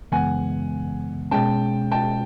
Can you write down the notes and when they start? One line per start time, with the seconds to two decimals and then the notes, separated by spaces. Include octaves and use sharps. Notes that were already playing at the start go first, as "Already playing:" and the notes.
0.12 F#2 C#3 E3 G#3 B3 F#5 G#5
1.31 B2 G#3 C#4 G5 A5
1.91 G5 A5